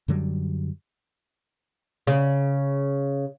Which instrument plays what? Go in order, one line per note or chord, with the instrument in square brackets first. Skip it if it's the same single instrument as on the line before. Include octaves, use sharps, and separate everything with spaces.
[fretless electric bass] F#2 D3 F#3 G3
[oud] C#3